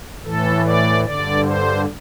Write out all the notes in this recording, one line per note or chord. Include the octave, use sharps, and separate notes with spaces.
A2 E3 A4
D5
G2 D3 D5
C5